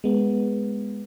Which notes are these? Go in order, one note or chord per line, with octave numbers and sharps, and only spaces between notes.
G#3 B3